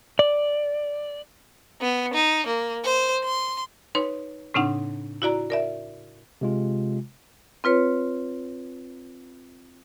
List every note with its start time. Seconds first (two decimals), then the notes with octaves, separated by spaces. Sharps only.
0.19 D5
1.81 B3
2.14 D#4
2.46 A#3
2.84 C5
3.24 C6
3.95 D#4 B4 C#5 C6
4.54 A2 C#3 C4 D4 D#4 F#5
5.22 E4 F#4 D5 A#5
5.50 A#4 D5 E5
6.41 C3 G#3 F4
7.64 C4 F4 B4 C#5